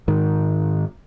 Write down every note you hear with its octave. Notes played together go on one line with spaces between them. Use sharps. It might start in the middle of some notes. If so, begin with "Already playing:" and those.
G#2 D#3